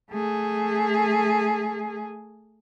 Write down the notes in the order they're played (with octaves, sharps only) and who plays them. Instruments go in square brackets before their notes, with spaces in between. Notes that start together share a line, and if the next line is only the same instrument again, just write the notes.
[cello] A3 G#4